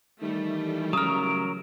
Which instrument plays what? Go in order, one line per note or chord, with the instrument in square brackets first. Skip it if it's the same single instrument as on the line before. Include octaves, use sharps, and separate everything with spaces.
[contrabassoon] D#3 [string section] E3 G3 A3
[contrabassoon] C#3 [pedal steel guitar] F#3 A#4 [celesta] D#6 F6